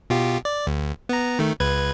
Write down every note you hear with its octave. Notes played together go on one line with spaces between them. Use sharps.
B2 F4 G4
D5
D2
B3 A#5
D#3 A3
C#2 B4 G#6